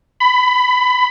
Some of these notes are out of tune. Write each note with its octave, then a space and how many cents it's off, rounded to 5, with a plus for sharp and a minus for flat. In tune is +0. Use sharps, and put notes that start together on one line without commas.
B5 +20